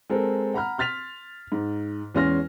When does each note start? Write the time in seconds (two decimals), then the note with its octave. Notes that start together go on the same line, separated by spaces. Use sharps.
0.10 G#3 C4 A4 A#4
0.54 F#5 A#5 B5 F6
0.78 C6 F6 A6 B6 F7
1.52 G#2
2.14 E2 G#3 C#4 C6 F6 A#6